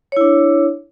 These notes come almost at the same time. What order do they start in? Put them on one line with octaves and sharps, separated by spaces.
C#5 E4 D4